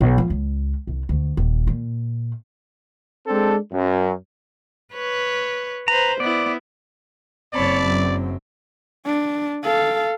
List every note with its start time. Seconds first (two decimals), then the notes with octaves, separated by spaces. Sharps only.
0.01 B1
0.18 F3
0.30 C#2
0.87 C2
1.09 D2
1.37 D#1
1.67 A#2
3.27 G#3 C4 D4 A4
3.72 F#2
4.93 B4 C#5
5.88 B4 C5 A#5
6.20 B3 E4 D5
7.54 F#1 C4 C#5 D5 A5 B5
7.84 F#2
9.06 D4
9.64 A4 F5